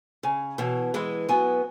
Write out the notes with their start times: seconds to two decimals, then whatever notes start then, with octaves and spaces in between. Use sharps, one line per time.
0.23 C#3 G#5
0.58 B2 E3 C#5
0.94 E3 G#3 B5
1.29 F#3 B3 G#5